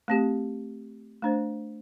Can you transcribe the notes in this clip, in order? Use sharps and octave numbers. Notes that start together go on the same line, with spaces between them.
A3 C4 G4
A3 D4 C5